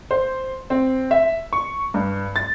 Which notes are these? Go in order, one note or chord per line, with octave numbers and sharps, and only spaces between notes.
C5
C4
E5
C#6
G2
A6